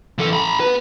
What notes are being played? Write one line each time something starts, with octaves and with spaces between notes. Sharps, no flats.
E3 A4
A#5 B5
B3 B4